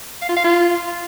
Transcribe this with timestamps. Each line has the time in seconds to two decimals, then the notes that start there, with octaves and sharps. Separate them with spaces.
0.22 F5
0.29 F4
0.37 F5
0.44 F4